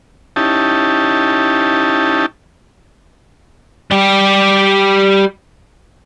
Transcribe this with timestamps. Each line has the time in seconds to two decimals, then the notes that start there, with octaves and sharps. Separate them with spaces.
0.36 C#4 D#4 E4 G4 A5
3.91 G3 G4